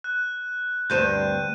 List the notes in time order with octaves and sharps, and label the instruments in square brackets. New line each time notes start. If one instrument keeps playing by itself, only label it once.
[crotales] F#6
[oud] D2 G2 C4 [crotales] G6 D#7